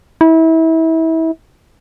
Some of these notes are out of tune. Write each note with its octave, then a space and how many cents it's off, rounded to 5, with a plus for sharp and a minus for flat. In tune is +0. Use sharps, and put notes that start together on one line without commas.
E4 -30